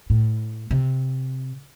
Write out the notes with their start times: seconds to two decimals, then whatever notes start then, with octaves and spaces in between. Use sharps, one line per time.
0.10 A2
0.71 C3